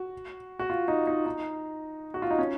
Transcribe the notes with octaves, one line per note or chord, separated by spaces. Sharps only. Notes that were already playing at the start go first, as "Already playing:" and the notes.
Already playing: F#4
F#4
F4
D#4
D#4
D#4
F#4
F4
D#4
C#4